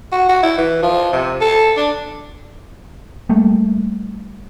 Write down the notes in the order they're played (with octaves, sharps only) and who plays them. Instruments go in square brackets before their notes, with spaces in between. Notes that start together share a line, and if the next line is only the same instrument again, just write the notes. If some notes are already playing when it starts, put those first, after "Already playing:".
[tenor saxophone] F#4
F#4
E4
E3
F3
C3
A4
D4
[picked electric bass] G3 A3 A#3